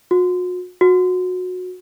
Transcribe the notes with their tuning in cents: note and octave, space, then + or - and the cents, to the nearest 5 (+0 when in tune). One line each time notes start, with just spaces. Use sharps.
F#4 -40
F#4 -20